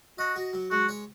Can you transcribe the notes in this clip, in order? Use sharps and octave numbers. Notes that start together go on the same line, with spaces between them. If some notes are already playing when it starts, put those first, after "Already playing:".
F#4 D#5
F#4
F#3
G#3 F#4
C#5